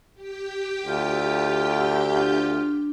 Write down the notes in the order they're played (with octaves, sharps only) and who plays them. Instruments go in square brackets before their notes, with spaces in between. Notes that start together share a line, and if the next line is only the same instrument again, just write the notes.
[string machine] G4 G5
[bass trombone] D2 [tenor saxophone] F4
[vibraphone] D4 [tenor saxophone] F4